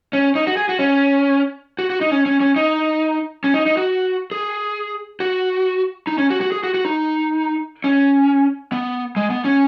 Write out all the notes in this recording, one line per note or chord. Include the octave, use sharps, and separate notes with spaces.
C#4
D#4
F#4
G#4
F#4
C#4
F#4
F#4
D#4
C#4
C#4
C#4
D#4
C#4
D#4
D#4
F#4
G#4
F#4
D#4
C#4
F#4
F#4
G#4
F#4
F#4
D#4
C#4
B3
G#3
B3
C#4